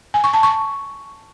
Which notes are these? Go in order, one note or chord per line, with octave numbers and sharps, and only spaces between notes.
G#5
C#6
A5
C#6